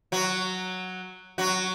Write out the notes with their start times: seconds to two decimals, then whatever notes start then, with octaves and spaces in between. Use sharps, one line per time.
0.12 F#3 F#4
1.38 F#3 F#4